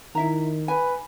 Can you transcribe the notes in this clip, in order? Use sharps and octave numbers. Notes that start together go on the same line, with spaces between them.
D#3 E4 E5 A#5
B4 G#5